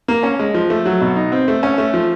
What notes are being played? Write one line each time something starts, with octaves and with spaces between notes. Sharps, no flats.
A#3
C#4
G#3
F3
A3
F#3
B2
D#4
C4
A3
C#4
A3
F3